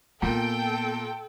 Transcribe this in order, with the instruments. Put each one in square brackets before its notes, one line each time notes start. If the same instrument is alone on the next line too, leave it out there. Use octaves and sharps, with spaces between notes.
[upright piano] A#2 [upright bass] B3 [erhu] A4 [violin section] G5